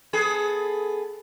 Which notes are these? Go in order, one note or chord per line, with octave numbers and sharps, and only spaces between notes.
B3 G#4 A4